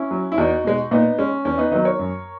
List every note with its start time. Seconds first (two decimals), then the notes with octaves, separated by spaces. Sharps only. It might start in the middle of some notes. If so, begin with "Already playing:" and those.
Already playing: C#4 E4
0.11 F#3
0.32 E4
0.38 E2 D#4 F#4
0.65 B2 G#3
0.91 A#2 B3 D#4
1.19 G#3 C#4
1.45 E2 C#4
1.58 B3 D#4
1.71 D#3 F#3 B3 D#4
1.85 A#4 C#5
1.99 F#2